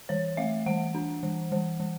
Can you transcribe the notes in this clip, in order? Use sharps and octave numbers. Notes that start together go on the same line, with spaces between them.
E3 C#5
A3 E5
E3 F#5
D4
E3
E3
E3